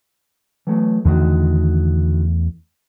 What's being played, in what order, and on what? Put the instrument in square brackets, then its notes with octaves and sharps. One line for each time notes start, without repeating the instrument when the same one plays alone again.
[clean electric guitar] E3 F#3 A3
[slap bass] E2 A3 [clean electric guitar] D3 D#3 F#4